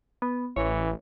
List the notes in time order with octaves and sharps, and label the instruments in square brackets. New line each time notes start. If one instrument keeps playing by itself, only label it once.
[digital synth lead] B3
[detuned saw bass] A1 [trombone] E3 [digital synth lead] C#5